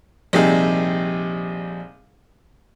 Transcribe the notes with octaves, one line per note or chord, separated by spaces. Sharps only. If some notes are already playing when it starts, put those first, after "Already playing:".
A#1 C3 G3 D#4 G#4